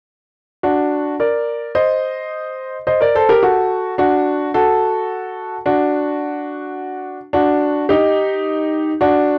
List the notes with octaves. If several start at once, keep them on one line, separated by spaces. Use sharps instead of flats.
D4 F#4
A#4 D5
C5 D#5
C5 D#5
A#4 D5
A4 C5
G4 A#4
F#4 A4
D4 F#4
F#4 A4
D4 F#4
D4 F#4
D#4 G4
D4 F#4